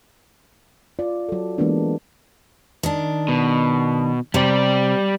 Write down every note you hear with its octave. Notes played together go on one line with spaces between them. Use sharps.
F4 D5
F#3 A4
E3 G#3 A#3 B3 D4
D#3 D4
B2
C3 G3 D5